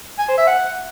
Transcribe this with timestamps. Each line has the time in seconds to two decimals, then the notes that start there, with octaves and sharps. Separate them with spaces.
0.19 G#5
0.28 C5
0.38 E5
0.47 F#5